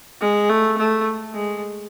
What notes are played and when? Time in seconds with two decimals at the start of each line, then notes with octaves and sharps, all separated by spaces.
0.21 G#3
0.49 A3
0.77 A3
1.34 G#3